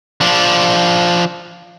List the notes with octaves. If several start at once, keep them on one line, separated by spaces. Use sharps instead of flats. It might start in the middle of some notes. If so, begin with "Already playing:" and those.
F3 D4